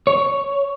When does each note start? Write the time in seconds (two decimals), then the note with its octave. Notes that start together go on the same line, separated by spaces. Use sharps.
0.07 C#5